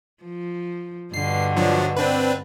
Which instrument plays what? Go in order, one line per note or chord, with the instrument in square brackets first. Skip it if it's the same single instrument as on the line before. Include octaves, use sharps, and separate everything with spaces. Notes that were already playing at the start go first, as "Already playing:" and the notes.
[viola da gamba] F3
[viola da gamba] G2 B2 D3 [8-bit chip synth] C7
[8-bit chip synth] F3 F#3 D4
C4 D4 B4